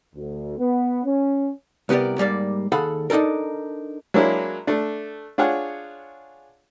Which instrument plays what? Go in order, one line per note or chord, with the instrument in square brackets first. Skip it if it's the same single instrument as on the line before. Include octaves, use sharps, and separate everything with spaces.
[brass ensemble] D2
B3
C#4
[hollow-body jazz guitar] C2 B3 G4 A#4 D5
G#2 G3 A#3 D5
D#2 G#4 A4 F5 F#5 B5
D4 D#4 F#4 A4 A#4
[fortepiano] F#3 G#3 A#3 D4 E4
A3 D4
D4 F4 G#4 C#5 F#5